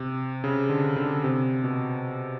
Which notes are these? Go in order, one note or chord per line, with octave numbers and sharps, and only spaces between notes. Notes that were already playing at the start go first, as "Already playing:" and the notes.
Already playing: C3
C#3
D3
D3
C3
B2